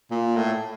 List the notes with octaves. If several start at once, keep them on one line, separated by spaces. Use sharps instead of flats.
A#2
A2